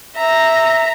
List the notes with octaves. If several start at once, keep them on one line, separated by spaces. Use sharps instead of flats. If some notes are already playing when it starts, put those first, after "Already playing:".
E5 A#5